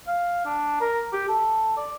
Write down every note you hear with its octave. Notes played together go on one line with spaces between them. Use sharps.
F5
D4
A#4
G4
A4
D5